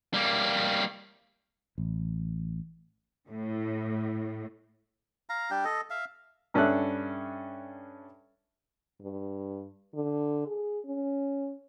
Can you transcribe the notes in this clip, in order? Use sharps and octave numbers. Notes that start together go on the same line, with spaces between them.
G3 A#3
A1
A2
F5 A#5
G3 D4 G4 G5
A4 D#5
E5 F5
G2 C#4 D4 A4 E5 F#6
G2
D3
G#4
C#4